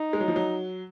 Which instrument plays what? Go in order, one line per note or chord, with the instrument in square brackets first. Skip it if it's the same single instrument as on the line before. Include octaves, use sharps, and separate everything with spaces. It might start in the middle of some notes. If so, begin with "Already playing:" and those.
Already playing: [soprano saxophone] D#4
[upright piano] G#3
F#3
F3
F#3